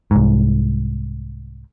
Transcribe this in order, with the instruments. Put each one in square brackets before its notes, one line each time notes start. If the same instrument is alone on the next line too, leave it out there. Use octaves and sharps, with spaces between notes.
[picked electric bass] C2 G#2